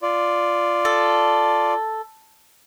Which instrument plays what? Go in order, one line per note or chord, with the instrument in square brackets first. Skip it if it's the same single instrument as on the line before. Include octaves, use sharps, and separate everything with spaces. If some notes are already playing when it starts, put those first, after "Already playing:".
[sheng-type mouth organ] F4 D5
[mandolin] A4